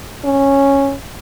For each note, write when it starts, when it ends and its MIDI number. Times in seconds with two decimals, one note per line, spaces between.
0.25 0.94 61